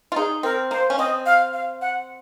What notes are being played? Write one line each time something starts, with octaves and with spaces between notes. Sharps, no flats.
F4
D#4 G#4
C4 A#4
A#3 C5
C#4
C4 D#5
F5
F5
F#5